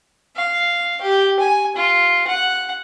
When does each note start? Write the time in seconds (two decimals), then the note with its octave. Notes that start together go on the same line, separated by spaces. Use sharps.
0.36 F5
1.02 G4
1.40 G#5
1.77 F4
2.28 F#5